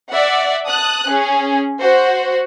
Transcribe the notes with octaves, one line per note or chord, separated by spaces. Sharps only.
D5 E5 F#5
A5 D#6 F#6
C#4 G#4
F#4 C5